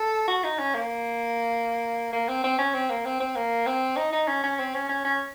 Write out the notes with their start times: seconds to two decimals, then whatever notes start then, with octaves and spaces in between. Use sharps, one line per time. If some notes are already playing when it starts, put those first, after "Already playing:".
Already playing: A4
0.28 F#4
0.44 D#4
0.59 C#4
0.74 A#3
2.13 A#3
2.28 C4
2.44 C4
2.59 C#4
2.74 C4
2.90 A#3
3.05 C4
3.20 C4
3.36 A#3
3.67 C4
3.97 D#4
4.12 D#4
4.28 C#4
4.43 C#4
4.59 C4
4.74 C#4
4.89 C#4
5.05 C#4